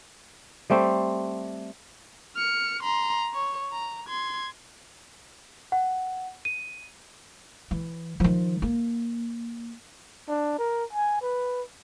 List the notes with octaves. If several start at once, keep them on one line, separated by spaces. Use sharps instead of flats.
G3 A3 C4
F6 C#7
A#5 C6
C#5
A#5
C6 G#6
F#5
D#7
E3
D#3 F3
A#3
D4
A#4
G#5
B4